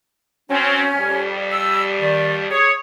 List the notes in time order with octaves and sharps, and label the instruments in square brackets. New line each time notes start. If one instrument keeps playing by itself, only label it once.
[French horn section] F#3 C4 [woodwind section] C#4
[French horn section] F2 G3
[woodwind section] E6
D#3 D5
[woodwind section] G#4 C#6 D#6 [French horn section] C#5